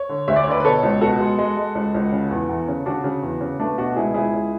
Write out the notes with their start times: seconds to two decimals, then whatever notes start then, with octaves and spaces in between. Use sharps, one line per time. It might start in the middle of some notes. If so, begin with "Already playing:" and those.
Already playing: C#5
0.09 D3
0.28 D2 E5
0.36 D5
0.43 C#5
0.47 D3 B4 D5
0.60 B4
0.65 B2 A4 C#5
0.83 C#2
1.01 B2 F#4 A4
1.20 G#3
1.38 G#3
1.57 G#3
1.75 C#2
1.94 C#2
2.12 C#3
2.31 E2
2.49 E2
2.68 C#3
2.86 C#3 D4 F#4
3.04 C#3
3.23 E2
3.41 C#3
3.59 A3 B3 D4
3.78 B2 D4 F#4
3.96 C#2 E4 G#4
4.14 C#2 E4 G#4
4.33 C#2